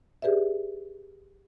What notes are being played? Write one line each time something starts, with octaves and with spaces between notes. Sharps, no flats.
G4 G#4 B4 D5 E5